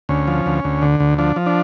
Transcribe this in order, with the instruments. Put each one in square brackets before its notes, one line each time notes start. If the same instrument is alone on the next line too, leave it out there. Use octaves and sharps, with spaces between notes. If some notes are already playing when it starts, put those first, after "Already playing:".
[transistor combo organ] D2 C#4
F3
D2
D2
D3
D2
F3 D4
F3
D4